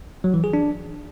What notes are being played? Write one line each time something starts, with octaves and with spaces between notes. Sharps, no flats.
F#3
E3
G#4
D4